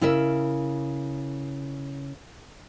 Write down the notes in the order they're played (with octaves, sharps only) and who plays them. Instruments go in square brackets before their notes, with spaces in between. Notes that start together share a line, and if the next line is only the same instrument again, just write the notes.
[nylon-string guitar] C#3 E4 A#4 E5